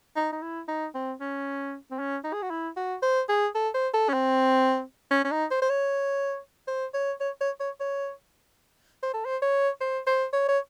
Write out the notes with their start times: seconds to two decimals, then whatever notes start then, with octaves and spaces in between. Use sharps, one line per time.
0.16 D#4
0.32 D#4
0.42 E4
0.68 D#4
0.95 C4
1.21 C#4
1.91 C4
1.99 C#4
2.24 D#4
2.33 G#4
2.42 F#4
2.51 E4
2.77 F#4
3.03 C5
3.29 G#4
3.55 A4
3.74 C5
3.94 A4
4.09 C#4
4.13 C4
5.11 C#4
5.24 C#4
5.31 D#4
5.51 C5
5.62 C5
5.70 C#5
6.68 C5
6.94 C#5
7.20 C#5
7.41 C#5
7.60 C#5
7.80 C#5
9.02 C5
9.14 A4
9.25 C5
9.42 C#5
9.81 C5
10.07 C5
10.33 C#5
10.49 C#5